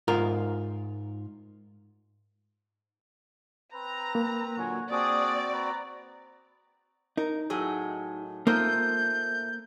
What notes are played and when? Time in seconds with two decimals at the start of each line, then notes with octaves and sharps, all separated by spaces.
0.08 G#2 F4 A#4 A#5
3.74 C4 B4 A#5
4.15 A#3
4.57 A#2 D3 F#3 F#4 G#5
4.90 C4 D4 F#4 G#4 D5 D#6
5.53 B4 A#5
7.17 D#4 A#4
7.50 A2 F#3 G#4
8.47 A3 A#3 D#4 F4 A#4 C5 G6